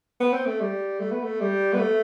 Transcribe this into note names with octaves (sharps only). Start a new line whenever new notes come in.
B3
C4
A3
G3
A3
B3
A3
G3
B3
A3